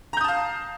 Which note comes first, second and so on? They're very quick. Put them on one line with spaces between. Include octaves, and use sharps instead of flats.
A#5 G6 D#6 A5 F5